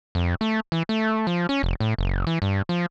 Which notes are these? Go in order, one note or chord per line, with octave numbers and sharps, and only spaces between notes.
F2
A3
E3
A3
F3
C#4
F1
A2
F#1
E3
G2
F3